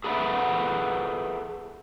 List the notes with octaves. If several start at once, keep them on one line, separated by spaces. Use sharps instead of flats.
G#4 A4 B4 D#5 E5 F#5